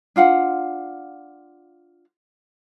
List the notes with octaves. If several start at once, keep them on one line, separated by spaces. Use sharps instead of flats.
D4 F4 F5 F#5